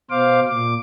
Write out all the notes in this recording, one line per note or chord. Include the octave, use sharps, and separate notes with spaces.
B2 C5 F5 D6
A#2 D6